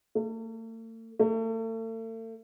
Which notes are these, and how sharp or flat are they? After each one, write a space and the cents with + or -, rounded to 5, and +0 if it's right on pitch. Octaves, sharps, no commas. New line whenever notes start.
A3 +45
A3 +40